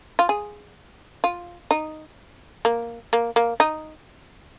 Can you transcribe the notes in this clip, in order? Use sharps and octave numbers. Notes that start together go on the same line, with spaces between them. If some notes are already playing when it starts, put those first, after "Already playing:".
F4
G#4
F4
D#4
A#3
A#3
A#3
D#4